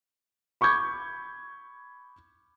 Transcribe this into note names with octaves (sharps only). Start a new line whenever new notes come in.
B5 C#6 D6 G6 G#6